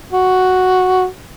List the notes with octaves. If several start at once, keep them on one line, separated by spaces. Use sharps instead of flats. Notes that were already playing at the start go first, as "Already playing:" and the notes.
F#4